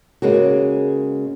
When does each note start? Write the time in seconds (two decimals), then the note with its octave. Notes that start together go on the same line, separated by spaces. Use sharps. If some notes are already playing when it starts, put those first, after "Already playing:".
0.22 C#3 G#3 A#3 F#4